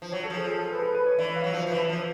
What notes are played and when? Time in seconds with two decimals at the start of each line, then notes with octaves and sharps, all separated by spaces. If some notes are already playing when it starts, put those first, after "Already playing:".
0.02 F3
0.12 F#3 C#5
0.24 A4
0.30 F3
0.36 G#4
0.47 G#4
0.59 A4
0.71 B4
0.82 B4
0.95 B4
1.06 C#5
1.19 E3 D5
1.36 F5
1.44 F#3
1.53 F3
1.67 F3
1.72 E3
1.89 F3